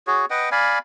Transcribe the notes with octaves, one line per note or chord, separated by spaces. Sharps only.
F#4 G#4 C#5
B4 D#5 F#5 G5
D5 F5 G#5 B5